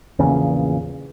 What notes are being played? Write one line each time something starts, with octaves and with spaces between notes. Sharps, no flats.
A#1 E2 A#2 C#3